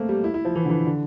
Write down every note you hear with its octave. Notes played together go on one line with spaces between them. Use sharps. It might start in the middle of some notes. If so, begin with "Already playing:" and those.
Already playing: A3 A#3 C4
G3
E4
E4
F3
E3
D3
E3
D3